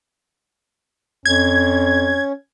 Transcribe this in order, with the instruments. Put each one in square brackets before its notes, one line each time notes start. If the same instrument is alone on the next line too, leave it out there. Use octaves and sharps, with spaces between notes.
[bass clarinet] F2 [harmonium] C#4 [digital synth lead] G#6